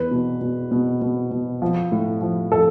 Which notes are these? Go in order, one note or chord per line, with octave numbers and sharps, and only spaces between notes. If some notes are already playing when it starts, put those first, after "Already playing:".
Already playing: E2 B4
B2
B2
B2
B2
B2
F3
A2
F3
F3 A4